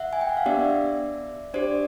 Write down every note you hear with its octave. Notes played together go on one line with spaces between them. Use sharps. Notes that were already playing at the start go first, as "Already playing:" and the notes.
Already playing: E5 F#5
G#5
G5
F#5
F5
B3 D4 G4 D5 E5
D4 G4 C5 D5